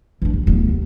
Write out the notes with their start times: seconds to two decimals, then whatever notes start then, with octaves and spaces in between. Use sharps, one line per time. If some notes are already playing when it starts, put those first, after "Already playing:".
0.22 E3 D4
0.33 D#1
0.47 D1 B3
0.69 D#2